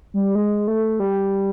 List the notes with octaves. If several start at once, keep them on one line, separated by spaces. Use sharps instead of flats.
G3
G#3
A3
G3